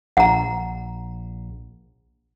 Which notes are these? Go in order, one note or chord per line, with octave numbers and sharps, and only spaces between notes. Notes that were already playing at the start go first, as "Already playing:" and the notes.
A#1 F#5 A#5